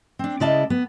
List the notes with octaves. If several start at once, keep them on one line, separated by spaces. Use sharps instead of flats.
C4 D4
C#3 G#3 E4 D5 D#5 A5
B3